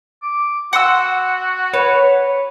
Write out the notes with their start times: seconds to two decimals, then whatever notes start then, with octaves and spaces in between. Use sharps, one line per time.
0.22 D6
0.73 F#4 F#5 C6 E6
1.74 B4 C#5